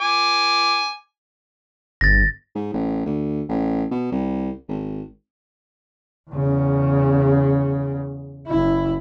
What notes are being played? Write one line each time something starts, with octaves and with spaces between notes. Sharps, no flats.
G#5 D6
G1 A6 A#6
G#2
A1
D2
A1
B2
C2
G#1
E2 C#3
F#1 E4